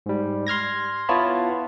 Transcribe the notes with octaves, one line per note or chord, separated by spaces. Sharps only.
G#2 G3
C6 F6 G#6 A#6
B3 E4 F4 C#5 A5 B5